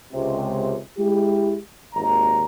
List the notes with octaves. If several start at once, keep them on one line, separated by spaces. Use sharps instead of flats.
C#2 C3
G#3 E4 G4
G#1 D#2 A#2 A#5